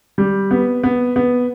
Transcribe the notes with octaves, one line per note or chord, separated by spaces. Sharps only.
G3
B3
B3
B3